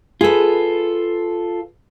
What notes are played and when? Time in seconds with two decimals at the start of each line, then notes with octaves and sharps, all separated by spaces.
0.21 F4 G#4 A4 B4